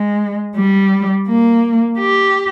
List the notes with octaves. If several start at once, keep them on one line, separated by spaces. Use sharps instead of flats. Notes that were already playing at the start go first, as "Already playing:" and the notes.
Already playing: G#3
G3
A#3
G4